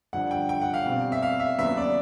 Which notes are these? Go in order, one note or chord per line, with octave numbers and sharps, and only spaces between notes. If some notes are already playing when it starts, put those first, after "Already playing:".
G2 D3 F3 F#5
G5
G5
F#5
F5
B2 G3 C4
E5
F5
E5
D#2 C#3 F#3 B3 E5
D5